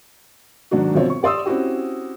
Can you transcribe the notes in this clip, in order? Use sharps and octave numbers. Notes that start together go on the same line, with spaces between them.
G#2 D#3 F#3 D4 F#4
G1 B2 F3 C4 C#5
C#6
G4 D5 C6 D#6 E6
C4 C#4 E4 F#4 G4